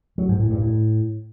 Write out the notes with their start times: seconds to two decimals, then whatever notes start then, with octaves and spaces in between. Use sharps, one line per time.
0.18 F#3
0.29 G#2
0.39 A2
0.50 G2
0.61 A2